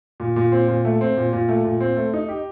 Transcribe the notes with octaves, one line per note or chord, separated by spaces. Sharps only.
A#2
A#2
C4
A#2
A3
C4
A#2
A#2
A3
A#2
C4
A3
D#4
G4